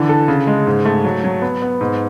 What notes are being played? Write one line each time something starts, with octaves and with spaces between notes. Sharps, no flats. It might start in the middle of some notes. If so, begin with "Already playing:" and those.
Already playing: D3 E3
A4
C#3
G#3
G#2
A3
F#3
F#3
B3
B3
G#2